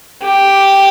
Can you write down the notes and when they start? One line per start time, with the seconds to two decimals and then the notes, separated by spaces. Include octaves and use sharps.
0.23 G4